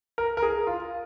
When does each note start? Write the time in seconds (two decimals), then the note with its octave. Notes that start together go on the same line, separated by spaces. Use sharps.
0.18 A#4
0.37 A#4
0.43 G#4
0.67 F4